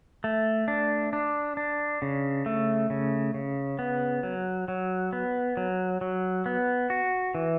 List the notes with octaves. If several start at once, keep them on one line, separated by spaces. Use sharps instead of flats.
A3
D4
D4
D4
C#3
A3
C#3
C#3
B3
F#3
F#3
B3
F#3
F#3
B3
F#4
E3